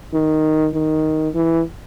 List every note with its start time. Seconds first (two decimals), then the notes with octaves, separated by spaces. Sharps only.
0.13 D#3
0.74 D#3
1.35 E3